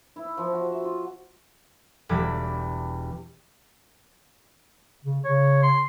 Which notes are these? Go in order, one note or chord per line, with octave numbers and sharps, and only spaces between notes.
E4
F3
F#4
E5
F4
E1 G3 B5 D6 G#6
C#3
C#3 C#5
C6